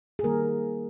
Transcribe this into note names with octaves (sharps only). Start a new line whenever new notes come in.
G#4
D#3 G3 A#3 A#4